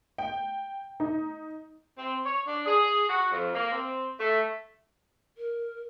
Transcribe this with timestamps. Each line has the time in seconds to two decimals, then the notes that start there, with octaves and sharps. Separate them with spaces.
0.18 G5
1.00 D#4
1.97 C4
2.25 C#5
2.47 D4
2.66 G#4
3.09 F#4
3.31 F2
3.54 A#3
3.72 C4
4.19 A3
5.37 A#4